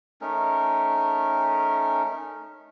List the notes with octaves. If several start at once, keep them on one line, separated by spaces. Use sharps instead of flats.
A3 C#4 D#4 A#4